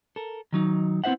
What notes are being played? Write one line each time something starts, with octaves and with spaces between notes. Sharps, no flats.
A4 A#4
D#3 F#3 D#4
B3 C4 E4 C5 E5 F#5